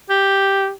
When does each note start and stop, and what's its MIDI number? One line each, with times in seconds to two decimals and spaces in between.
0.10 0.71 67